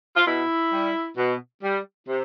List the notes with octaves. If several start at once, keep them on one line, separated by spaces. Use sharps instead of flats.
F4
B2 E4
G3
B2
G3
C3